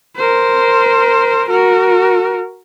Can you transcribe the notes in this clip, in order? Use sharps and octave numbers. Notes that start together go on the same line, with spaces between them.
A#4 C5
F#4 A#4